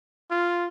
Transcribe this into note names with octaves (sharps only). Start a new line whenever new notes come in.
F4